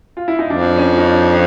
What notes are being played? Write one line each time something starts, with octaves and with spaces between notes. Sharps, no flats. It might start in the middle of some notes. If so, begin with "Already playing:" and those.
F4
E4
D#4
F2 D4
C#4
D#4
D4